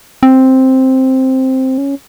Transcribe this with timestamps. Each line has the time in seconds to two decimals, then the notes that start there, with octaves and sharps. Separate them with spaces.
0.23 C4
1.78 C#4